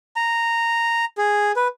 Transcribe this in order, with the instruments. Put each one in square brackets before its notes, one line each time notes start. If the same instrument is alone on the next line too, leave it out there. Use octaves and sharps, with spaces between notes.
[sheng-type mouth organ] A#5
G#4
B4